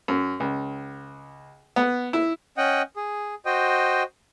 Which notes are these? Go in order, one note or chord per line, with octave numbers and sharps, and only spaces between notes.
F#2
C#2
B3
E4
C#4 D#5 F#5 G5
G#4
F#4 C5 D#5 G5